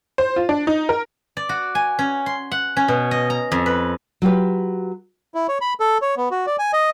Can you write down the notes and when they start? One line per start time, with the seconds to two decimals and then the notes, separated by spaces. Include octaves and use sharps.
0.18 C5
0.36 F4
0.49 D4
0.67 D#4
0.89 A#4
1.37 D5
1.49 F#4
1.75 G#5
1.99 C#4
2.26 C6
2.51 F#5
2.77 C#4
2.88 B2
3.11 D#5
3.30 A#5
3.52 F2
3.66 B4
4.22 F#3 F4 G4 B4
5.34 E4
5.48 C#5
5.61 B5
5.80 A4
6.02 C#5
6.17 B3
6.31 F#4
6.46 D5
6.59 G#5
6.73 D#5